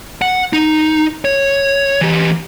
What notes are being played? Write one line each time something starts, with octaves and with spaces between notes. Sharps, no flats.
F#5
D#4
C#5
E3 G4